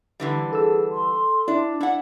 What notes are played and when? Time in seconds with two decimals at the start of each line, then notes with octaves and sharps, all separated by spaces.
0.20 D3 E3 G3
0.53 G#4 A4 E6
0.92 C6
1.48 D4 E4 D5
1.81 D4 E4 F#5